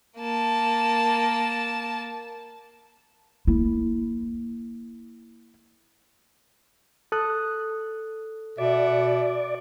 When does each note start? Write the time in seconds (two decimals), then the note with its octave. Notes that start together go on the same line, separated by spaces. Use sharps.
0.18 A#3 A5
3.47 A#3 E4
7.12 A4 D#6 F#6
8.58 B2 D5 E5 F#5